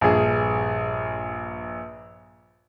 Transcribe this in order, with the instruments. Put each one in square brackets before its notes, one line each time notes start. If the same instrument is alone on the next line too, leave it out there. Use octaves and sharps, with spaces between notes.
[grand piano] A#1 G2 G#4